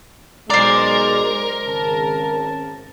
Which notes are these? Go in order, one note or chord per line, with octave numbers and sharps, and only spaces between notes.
B1 G#3 A#4 C5 D5
G#1 C#3 A5